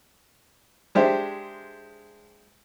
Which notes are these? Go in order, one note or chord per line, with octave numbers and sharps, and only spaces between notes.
G#3 D4 G4 C5 E5